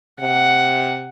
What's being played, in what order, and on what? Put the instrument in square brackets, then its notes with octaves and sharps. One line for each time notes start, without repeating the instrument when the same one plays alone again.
[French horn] C3 [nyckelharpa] F#5